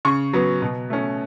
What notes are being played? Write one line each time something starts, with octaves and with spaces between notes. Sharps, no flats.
C#3 C#6
F#3 B3
B2
A3 C#4